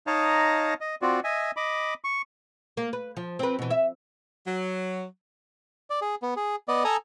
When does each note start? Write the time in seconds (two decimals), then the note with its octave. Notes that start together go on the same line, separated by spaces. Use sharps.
0.07 D#4 C#5 D#5 F5 A5 A#5
0.81 D#5
1.02 C4 F4 F#4 D5
1.24 D#5 E5 G#5
1.57 D#5 B5 D6
2.04 C#6
2.77 A#3
2.93 B4
3.17 F3
3.39 C4 B4
3.59 B2 E3
3.70 E5
4.46 F#3
5.90 D5
6.02 G#4
6.22 B3
6.36 G#4
6.68 B3 D5 D#5
6.85 A4 G#5 A#5 D#6